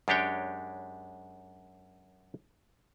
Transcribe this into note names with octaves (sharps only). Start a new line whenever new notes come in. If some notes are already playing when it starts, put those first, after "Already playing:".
F#2 G#3 D4 G4 C#5 G5